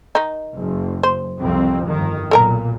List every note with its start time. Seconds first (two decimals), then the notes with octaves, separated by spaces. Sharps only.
0.15 D#3 D#4
0.57 F#1
1.03 C5
1.40 C2 F2 C4
1.86 G1 D#3
2.31 B1 A#2 A4 A#4 A#5